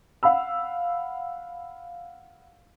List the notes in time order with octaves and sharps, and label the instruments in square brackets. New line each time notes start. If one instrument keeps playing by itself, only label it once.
[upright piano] F5 F#5 B5 E6